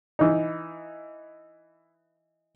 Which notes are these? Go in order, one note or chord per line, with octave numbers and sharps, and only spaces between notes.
E3 D#4